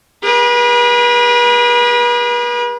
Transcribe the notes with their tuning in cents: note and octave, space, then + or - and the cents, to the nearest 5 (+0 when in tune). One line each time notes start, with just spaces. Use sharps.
G#4 -45 B4 -40